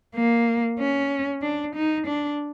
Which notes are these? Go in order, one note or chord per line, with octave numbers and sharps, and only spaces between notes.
A#3
C#4
D4
D#4
D4